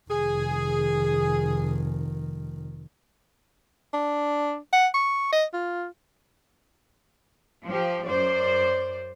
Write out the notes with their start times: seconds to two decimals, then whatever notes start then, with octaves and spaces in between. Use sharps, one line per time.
0.10 F1 D#3 G#4
3.94 D4
4.73 F#5
4.94 C#6
5.32 D#5
5.53 F4
7.66 F3 G4
8.06 F#2 C5 D5